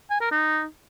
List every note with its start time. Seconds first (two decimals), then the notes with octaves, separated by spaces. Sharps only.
0.10 G#5
0.21 A#4
0.31 D#4